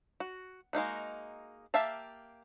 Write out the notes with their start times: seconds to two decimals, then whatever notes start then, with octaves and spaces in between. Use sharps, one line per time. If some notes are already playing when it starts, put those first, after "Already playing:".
0.20 F#4
0.73 G#3 A#3 D#4 F#4
1.74 A#3 G4 E5 F5 A5